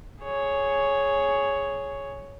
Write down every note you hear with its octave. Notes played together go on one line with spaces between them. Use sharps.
G#4 C#5